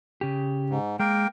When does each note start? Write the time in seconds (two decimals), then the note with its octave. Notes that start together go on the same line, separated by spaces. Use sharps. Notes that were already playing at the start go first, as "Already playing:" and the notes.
0.21 C#3 G4
0.70 G#2
0.99 G#3 A#3 A#4 G5